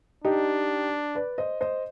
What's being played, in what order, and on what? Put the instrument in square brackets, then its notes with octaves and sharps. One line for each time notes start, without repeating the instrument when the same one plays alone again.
[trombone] D4 [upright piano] D#4 G4
[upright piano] B4 D5
C5 D#5
C5 D#5